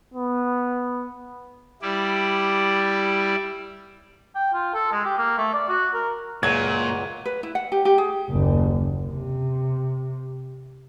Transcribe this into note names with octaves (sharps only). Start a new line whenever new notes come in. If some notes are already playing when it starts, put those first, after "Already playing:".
B3
G3 E4 D5
G5
F4
A4
G#3
G4
A#3
A3
D5
F#4
A#4
C#2 F#2 A#2 F#3 G#4 D5 G#6 D#7
B4
E4
F#5
G4
G4
G#4
F#1 D#2
C3